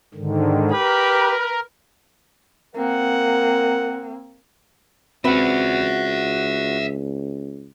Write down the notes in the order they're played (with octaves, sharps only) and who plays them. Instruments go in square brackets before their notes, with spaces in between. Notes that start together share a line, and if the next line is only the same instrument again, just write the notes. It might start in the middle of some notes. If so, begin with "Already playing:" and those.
[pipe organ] G#2 D3 D#3
[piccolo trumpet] G4 [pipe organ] A#4 [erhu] B4
[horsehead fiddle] A#3 C4 [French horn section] A#4 [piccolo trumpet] F#5
[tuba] C#2 [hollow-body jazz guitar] C4 B4 [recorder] F#4 [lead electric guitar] E5 F#5